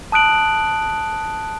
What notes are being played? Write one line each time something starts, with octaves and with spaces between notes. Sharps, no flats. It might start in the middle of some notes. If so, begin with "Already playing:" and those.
A5 D#6 F#6 D7 F#7